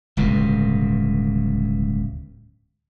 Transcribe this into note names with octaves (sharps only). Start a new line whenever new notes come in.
D1 C#2 G2 B2